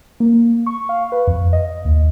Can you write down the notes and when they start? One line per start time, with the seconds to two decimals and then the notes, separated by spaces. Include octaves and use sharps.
0.20 A#3
0.66 C#6
0.89 F5
1.12 B4
1.27 F2
1.53 D#5
1.85 D#2